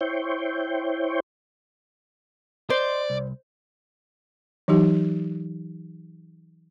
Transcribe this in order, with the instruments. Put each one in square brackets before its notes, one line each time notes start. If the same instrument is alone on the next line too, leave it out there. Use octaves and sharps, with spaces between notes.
[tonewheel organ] E4 C5 C#5 G5
[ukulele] C5 [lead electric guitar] D5 [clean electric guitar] D#5 C6
[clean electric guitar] C2
[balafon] E3 F#3 D#4 G4